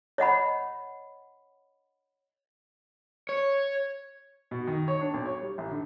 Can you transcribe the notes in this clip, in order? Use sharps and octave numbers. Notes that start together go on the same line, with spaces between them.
C#5 D#5 F#5 B5
C#5
B2
D#3
C#5
D4
B1
C#5
G3
A1
D3